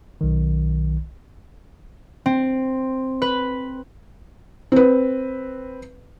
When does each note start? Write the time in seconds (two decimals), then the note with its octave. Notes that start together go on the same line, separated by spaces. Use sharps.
0.21 B1 D#3
2.26 C4
3.22 B4
4.72 C4 B4